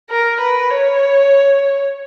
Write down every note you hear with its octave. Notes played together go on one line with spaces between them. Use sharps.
A#4
B4
C#5